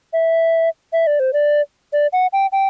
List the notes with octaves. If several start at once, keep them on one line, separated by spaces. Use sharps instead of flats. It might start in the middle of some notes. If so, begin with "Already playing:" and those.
E5
E5
D5
C5
D5
D5
F#5
G5
G5